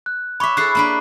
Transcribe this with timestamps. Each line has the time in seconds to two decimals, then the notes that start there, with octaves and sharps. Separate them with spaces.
0.06 F#6
0.40 C#5 E5 B5 C#6 D6
0.57 E4 G#4 A4 F#6 C7
0.75 A#3 D4 B4